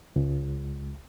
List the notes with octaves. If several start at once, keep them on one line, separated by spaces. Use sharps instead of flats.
C#2